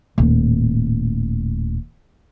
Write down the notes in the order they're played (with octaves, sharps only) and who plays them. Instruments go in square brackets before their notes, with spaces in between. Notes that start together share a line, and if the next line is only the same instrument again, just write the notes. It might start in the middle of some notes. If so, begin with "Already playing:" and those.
[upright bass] D#1 A2